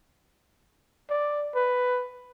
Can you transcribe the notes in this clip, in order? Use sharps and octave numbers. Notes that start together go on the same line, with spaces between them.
D5
B4